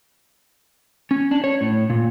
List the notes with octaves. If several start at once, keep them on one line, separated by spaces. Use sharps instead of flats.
C#4
D4
C#5
A2
A#2